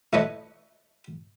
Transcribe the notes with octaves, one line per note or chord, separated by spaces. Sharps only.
A3 E4 B4 C#5 D#5